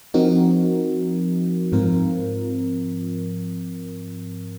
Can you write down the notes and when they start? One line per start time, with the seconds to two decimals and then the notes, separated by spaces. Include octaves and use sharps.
0.14 F3 C4 D#4 F#4 A#4
1.72 G#2 F3 C4 F4 A#4